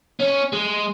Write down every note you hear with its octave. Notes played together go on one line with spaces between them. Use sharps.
C#4
G#3